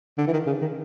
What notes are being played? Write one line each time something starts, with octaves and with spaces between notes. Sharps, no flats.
D3
E3
D#3
C#3
D#3